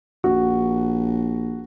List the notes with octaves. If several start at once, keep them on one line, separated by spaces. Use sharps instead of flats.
A#1 F#4